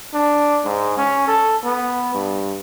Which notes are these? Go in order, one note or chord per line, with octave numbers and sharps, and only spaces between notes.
D4
G#2
C#4
A4
B3
G2